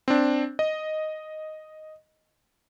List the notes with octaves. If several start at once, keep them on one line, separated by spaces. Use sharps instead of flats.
C4 D4
D#5